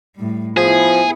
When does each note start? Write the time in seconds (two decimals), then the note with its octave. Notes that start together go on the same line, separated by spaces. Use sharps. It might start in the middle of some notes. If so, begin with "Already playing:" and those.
0.16 A2 G3
0.57 F3 B3 E4 G#4